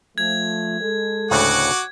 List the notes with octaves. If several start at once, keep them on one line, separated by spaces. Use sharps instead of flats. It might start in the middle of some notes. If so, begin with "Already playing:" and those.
F3 A3 G#6
G#3 A4
D2 A2 C#3 F#4 F#5 D6